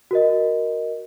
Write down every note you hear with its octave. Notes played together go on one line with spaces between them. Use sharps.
F#4 A#4 D#5